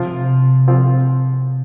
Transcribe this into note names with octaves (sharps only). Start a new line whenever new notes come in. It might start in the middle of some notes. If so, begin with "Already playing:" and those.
Already playing: C3 F3 C4 F4
F3 C4 F4